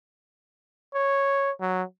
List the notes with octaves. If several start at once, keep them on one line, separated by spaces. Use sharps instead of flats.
C#5
F#3